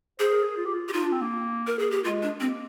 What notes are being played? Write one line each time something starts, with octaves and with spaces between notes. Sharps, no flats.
G#4 C5
A#4
G#4
F4
G4
F4
G4
D#4 F4
D4
C4
A#3
A#4
G#4
G4
G#3 F4
D4
A#3 C4